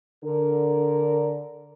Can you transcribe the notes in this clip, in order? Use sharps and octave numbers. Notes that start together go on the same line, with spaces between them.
D3 A#4